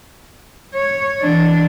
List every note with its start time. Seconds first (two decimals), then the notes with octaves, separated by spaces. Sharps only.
0.74 C#5
1.20 E3 D4